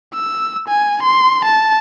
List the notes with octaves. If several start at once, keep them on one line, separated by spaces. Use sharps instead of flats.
E6
G#5
C6
A5